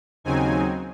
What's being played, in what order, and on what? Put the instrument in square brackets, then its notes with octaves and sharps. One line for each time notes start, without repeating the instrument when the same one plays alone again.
[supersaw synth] D#2 C#3 F#3 C4 D#4 G#5